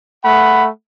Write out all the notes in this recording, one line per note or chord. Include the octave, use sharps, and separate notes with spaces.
A3 F#5 B5